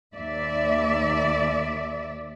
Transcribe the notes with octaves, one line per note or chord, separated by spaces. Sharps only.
D#2 D5 E5